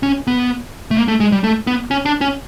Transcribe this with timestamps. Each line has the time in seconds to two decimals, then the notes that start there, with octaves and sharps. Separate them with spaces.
0.03 C#4
0.27 B3
0.91 A3
0.97 A#3
1.08 A3
1.20 G#3
1.32 G3
1.44 A3
1.67 B3
1.91 C#4
2.05 D4
2.21 C#4